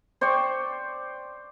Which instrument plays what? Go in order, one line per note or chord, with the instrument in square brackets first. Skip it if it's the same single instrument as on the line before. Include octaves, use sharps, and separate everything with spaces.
[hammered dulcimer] C5 D5 G5 C#6